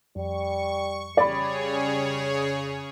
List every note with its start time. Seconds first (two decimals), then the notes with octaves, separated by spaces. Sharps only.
0.16 F2 G3 C#6
1.17 C#3 G3 G#4 C#5 D5 B5